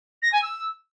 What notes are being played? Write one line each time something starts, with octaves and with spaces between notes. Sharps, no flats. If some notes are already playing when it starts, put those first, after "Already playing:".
A#6
G#5
E6